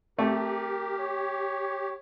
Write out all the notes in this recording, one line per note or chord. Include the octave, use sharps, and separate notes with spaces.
A3 C4 G4 A#4 A5 G6
C#5